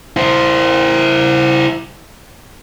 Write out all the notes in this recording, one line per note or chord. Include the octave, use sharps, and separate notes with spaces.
E4 C5